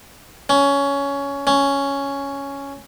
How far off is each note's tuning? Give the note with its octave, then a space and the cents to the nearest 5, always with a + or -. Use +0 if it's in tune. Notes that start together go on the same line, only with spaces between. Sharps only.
C#4 +15
C#4 +5